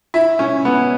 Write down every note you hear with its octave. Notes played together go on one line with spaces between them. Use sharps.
E4
C#4
B3